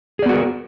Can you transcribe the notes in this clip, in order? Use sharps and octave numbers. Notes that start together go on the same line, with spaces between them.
B3 F#4 G#4 A#4 D5